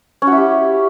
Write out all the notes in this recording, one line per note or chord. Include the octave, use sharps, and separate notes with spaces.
C#4
F#4
E4
G4